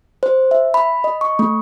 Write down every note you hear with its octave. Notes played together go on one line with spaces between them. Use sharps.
C5
E5
B5
D#5
C#6
A3